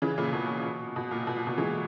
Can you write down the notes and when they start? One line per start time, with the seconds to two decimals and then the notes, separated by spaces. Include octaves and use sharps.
0.02 C#3 E3
0.18 A#2 C#3
0.33 B2
0.96 B2
1.11 A#2
1.27 B2
1.36 A#2
1.47 B2
1.58 E3 G#3